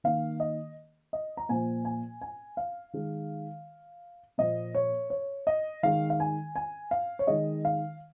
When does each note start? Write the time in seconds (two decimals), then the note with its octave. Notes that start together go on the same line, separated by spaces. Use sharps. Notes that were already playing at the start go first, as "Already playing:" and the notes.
0.04 D#3 A#3 F5
0.40 D#5
1.13 D#5
1.37 A#5
1.49 A#2 F3 A#3 G#5
1.85 G#5
2.21 G#5
2.57 F5
2.93 D#3 G#3
4.38 A#2 F3 A#3 D#5
4.75 C#5
5.10 C#5
5.47 D#5
5.83 D#3 G#3 F5
6.10 F5
6.20 G#5
6.56 G#5
6.91 F5
7.19 C#5
7.27 D#3 G#3 D#5
7.65 F5